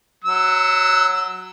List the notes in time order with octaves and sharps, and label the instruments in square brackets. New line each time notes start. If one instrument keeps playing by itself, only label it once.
[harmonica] F#3 E6